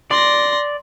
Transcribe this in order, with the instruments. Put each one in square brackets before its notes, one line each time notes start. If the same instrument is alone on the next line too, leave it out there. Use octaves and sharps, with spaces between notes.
[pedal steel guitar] D5 [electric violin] C6 A#6